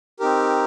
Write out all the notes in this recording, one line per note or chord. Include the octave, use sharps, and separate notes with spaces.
C4 D#4 G4 A#4